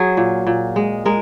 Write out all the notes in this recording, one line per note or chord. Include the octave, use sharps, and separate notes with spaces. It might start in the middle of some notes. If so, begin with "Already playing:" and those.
Already playing: F#3 G#4
A#2
A#2
G#3
G#3 A#4